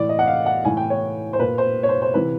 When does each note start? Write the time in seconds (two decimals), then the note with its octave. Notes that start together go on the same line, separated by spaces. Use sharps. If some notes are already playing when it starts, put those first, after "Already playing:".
Already playing: A2 E3 D5
0.09 D#5
0.19 F#5
0.27 F5
0.46 F#5
0.65 A2 E3 G#5
0.77 G5
0.90 C#5
1.33 C5
1.39 A#2 B4
1.58 C5
1.83 C#5
1.89 C5
2.02 C5
2.14 C3 E3 B4